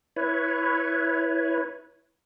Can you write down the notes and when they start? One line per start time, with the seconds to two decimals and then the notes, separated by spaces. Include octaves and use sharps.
0.16 E4 B4 C#5